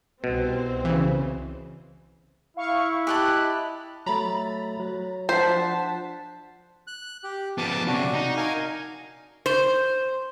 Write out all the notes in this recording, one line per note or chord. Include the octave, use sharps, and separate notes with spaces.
C2 B2 C4 C5
C#3 E3
E4 F5 C#6
G4 D#5 A5 F#6
F#3 A3 A#5 B5 A6
F#3
F3 D4 C5 F#5 A5 B6
F#6
G4
F3 B3 A5 D6
C3 C#4 D4 F#4
D#4
A#4 F5 G#5
C5